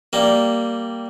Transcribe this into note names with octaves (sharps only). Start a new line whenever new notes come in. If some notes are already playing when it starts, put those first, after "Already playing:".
G3 A#3